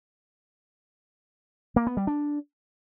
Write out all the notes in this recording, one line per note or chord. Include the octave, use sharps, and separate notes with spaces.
A#3
B3
G3
D4